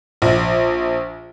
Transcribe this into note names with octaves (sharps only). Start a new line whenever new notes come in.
A#1